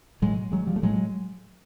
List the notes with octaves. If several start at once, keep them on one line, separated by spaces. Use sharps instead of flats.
A2 F#3 G#3
F#3 G#3
F3 G3
A3
A2 F#3 G#3